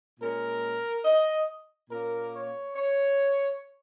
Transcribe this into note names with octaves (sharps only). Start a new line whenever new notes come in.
A#2 G#3 C#4 A#4
D#5
A#2 A#3 C#4 A#4
C#5
C#5